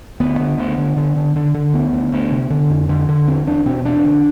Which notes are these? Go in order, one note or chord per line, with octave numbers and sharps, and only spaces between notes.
D2 B3
D3
D2
D3
D3
D3
D3
D3
D2 B3
D2
D2
C3
D3
F2
D3
D3
E2 C4
E2 D4
B2 C4
E2 D4
D3